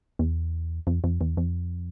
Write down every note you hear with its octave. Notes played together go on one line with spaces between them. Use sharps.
E2
F2
F2
E2
F2